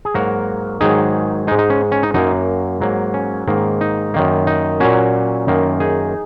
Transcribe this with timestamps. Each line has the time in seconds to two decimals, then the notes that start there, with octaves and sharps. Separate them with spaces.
0.05 G#4
0.14 G#2 F#3 A#3 F#4 A#4
0.81 G#2 D#3 F#3 D#4 G#4
1.47 G#3 D#4
1.51 G#2
1.59 D#4
1.70 C#4
1.92 C#4
2.03 D#4
2.14 F#2 F#3 A#3 D#4
2.81 G#2 F#3 A#3
3.14 C#4
3.48 G#2 D#3 A#3
3.81 D#4
4.14 F#2 D#3 A#3
4.47 D#4
4.80 A#2 F#3 A#3 C#4 F#4
5.47 F#2 D#3 A#3
5.80 D#4 G#4